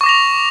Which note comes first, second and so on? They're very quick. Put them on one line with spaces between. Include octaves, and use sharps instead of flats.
C#6 D6 A#6 F7